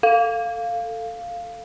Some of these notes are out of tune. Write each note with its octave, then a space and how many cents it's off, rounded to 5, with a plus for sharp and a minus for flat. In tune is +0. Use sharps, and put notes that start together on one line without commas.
A4 +15 F5 +0